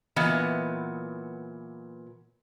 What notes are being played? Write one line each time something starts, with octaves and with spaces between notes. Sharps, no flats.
A#2 E3 F#3 B3 D#5